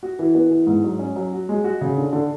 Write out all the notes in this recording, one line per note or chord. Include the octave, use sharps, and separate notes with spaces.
F#4
E3
B3
E3
G#2
F#3
C#4
F#3
F#4
G#3
F#4
C#3
D3
D3